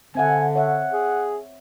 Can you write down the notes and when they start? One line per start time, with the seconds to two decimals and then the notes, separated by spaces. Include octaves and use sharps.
0.15 D3 C4 E5 F#5 G#5
0.55 C#5 E5 F#5
0.93 G#4